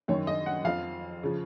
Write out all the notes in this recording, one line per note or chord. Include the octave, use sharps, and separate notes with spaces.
F#2 D#3 C#5
D#5
F#5
F2 F3 F5
C#3 F3